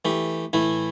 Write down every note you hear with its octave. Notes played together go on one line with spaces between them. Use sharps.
E3 A3 G4
A2 E3 A3 E4